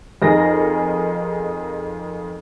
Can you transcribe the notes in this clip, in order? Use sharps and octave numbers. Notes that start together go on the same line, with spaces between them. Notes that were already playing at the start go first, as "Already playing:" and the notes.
F2 D#4 G#4 A#4 A#6